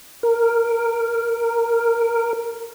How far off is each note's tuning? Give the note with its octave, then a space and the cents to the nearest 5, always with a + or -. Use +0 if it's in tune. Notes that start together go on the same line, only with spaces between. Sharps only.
A#4 -5